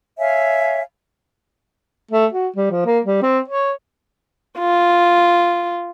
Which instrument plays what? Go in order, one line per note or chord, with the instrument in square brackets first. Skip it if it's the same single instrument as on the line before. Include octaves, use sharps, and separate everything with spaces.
[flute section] C#5 E5 F5 G#5
[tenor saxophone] A3
F#4
G3
F3
A#3
G3
C4
C#5
[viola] F4